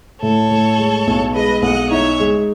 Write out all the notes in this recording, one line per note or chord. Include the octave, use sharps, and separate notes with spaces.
A2 A4 C#5
A2
G#3
B1
G#3 B4 D#5
B1 D#5 F#5
D#4 C#5 E5
G#3